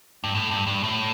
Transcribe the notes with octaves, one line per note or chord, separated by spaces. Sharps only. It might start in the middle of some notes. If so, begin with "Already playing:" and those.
G2
A2
G2
G2
A2